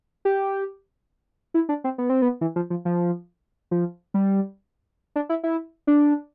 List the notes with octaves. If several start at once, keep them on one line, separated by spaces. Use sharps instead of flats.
G4
E4
D4
C4
B3
C4
B3
E3
F3
F3
F3
F3
G3
D4
E4
E4
D4